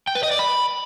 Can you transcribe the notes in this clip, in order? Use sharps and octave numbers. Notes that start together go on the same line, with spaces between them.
G5
B4
D#5
D5
B5